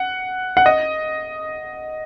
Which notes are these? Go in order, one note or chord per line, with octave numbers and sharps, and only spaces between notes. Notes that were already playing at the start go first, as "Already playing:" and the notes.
Already playing: F#5
F#5
D#5